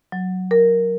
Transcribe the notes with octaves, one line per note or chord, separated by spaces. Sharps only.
F#3
A#4